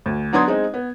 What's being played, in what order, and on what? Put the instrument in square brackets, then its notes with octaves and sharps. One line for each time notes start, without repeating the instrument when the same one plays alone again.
[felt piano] D2
F#3 B3 D4 C6 D#6 G#6
G#3 C4 D#4
B3